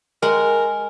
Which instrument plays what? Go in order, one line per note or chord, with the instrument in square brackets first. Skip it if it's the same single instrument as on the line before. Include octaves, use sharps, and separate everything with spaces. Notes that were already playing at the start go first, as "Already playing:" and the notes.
[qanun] G#3 F#5 [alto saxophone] A#4